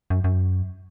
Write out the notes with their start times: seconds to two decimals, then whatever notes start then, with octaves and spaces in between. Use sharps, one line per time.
0.10 F#2
0.24 F#2